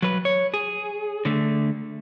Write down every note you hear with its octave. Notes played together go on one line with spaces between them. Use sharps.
F#3 B4
C#5
G#4
D3 A3